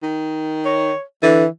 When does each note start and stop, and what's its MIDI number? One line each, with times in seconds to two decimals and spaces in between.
0.03 0.92 51
0.65 1.01 73
1.22 1.44 50
1.22 1.46 52